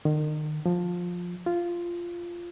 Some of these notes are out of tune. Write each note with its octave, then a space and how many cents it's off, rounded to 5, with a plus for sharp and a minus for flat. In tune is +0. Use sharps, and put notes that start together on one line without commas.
D#3 -35
F3 +15
F4 -10